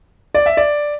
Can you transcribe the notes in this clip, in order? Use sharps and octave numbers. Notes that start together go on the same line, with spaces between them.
D5
E5
D5